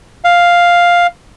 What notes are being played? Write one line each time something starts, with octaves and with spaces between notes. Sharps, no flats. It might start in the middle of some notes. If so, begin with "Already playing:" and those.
F5